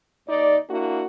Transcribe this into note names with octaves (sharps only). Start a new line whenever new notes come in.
D#2 D#4 D5
A#3 D4 E4 F#4